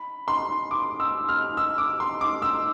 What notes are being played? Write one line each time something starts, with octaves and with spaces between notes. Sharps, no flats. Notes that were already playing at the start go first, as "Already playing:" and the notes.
Already playing: B5
C6
D6
E6
F6
E6
D6
C6
D6
E6